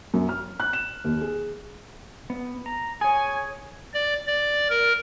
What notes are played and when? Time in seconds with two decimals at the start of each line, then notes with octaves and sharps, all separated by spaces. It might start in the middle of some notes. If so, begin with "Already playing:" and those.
0.14 F#2
0.29 F6
0.60 F#6
0.73 E7
1.04 D#2
1.21 G#4
2.30 B3
2.66 A#5
3.01 G#4 C#5 G#5
3.94 D5
4.27 D5
4.70 A#4